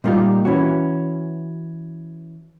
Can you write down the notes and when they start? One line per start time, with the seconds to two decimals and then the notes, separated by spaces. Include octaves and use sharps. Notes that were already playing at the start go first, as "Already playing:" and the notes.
0.04 A#2 G3 A#3 D#4 F4 G4
0.45 E3 C#4 F#4